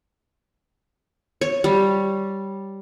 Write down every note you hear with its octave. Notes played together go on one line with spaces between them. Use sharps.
C#5
G3